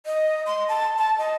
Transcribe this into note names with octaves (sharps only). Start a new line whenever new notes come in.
D#5
C6
A5
A5
D#5